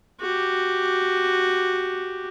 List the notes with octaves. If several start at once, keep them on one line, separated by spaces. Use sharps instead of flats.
F#4 G4